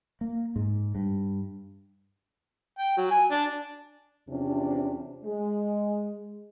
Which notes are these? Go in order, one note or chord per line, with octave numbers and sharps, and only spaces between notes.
A#3
G#2
G2
G5
F#3
G#5
D4
E2 C3 F3 C#4 D4
G#3